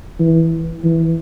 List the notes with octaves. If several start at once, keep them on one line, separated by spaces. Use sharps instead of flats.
E3
E3